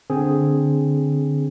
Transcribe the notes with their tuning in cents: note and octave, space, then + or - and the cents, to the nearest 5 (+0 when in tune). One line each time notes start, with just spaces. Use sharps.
D3 +0 C4 +0 G#4 +0